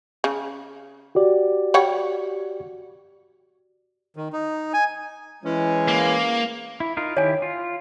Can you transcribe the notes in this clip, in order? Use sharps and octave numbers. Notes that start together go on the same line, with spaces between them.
C#3
F#4 G4 D5
G3 C#5 F#5
D#3
D#4
G#5
E3 G#3 C#4
A#3
E4
D#4 F4 A#4
D#3 E4 G4 C#5 G#5
F4